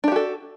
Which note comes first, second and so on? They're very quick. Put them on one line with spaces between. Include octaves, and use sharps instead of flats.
D4 G4 F#4 A4